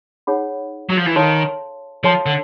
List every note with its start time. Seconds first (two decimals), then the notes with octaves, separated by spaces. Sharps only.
0.27 D#4 G#4 C#5 F#5 B5
0.89 F#3
0.97 F3
1.06 E3
1.16 D#3 A4 C#5 F5 A5 C6
2.04 F3 A4 C#5 F5 A5 C6
2.26 D3